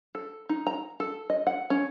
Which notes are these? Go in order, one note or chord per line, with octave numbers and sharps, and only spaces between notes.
A4
D#4
A#5
A4
D#5
F#5
C#4